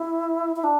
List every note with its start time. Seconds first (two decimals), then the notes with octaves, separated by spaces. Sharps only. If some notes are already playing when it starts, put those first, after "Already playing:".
Already playing: E4
0.56 E4
0.64 D4